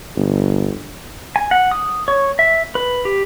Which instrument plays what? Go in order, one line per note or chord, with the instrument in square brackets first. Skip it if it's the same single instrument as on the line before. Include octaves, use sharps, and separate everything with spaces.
[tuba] G1
[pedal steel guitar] G#5
F#5
D#6
C#5
E5
B4
G4